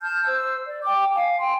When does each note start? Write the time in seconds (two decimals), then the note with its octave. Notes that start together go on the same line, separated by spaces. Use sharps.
0.01 A5 F6 G6
0.25 C5 E6
0.68 D5
0.84 G5 D6
1.14 F5 G#5
1.39 G5 G#5 C6